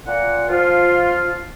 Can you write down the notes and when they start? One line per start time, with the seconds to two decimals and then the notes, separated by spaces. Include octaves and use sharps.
0.06 A#2 F#5
0.48 F3 F4